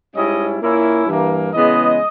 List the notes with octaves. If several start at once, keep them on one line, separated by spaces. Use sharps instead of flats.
G#2 G3 C#4 E4 D#5
A#2 A#3 C#4 E4
G2 E3 A#3
C#3 E3 G#3 B3 D#5